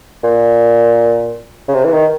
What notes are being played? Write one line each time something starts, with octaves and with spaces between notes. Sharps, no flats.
A#2
C#3
C3
E3
D#3